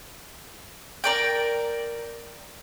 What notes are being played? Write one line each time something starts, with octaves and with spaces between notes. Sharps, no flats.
A#4 D5 G5